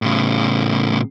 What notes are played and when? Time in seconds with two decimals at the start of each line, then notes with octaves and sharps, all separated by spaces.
0.02 A2 C#3